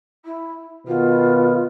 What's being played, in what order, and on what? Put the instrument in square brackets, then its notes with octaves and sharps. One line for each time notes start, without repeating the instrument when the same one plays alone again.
[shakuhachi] E4
[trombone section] B2 D#3 B3 [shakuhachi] F4